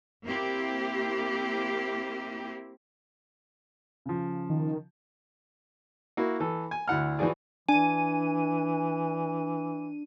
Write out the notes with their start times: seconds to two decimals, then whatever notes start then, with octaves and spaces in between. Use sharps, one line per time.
0.25 A#3 C4 E4 G4
4.06 C#3 F3
4.50 D#3
6.17 A#3 E4 F#4
6.40 E3 A4
6.71 G#5
6.88 D2 E4 F#5 F6
7.19 E3 F3 F#4 G#4 D5
7.69 E3 D4 G#5 D#7